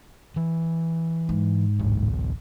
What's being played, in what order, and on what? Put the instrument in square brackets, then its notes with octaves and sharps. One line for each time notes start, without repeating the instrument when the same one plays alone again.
[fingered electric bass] E3
[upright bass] G#2
[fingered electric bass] D1 A1